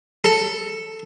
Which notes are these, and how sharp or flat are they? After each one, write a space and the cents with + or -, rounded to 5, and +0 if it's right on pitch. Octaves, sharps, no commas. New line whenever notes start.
A4 +5